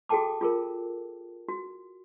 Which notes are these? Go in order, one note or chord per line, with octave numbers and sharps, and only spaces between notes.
F#4 G#4 A4 G5 A5 D6
F4 G#4 A#4
F#4